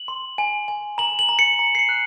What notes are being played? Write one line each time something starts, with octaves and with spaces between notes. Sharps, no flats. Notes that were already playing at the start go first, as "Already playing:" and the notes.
Already playing: F#7
C6
G#5
G#5
A#5 F#7
F#7
A#5
C#7
A#5
C7
C#7
F#6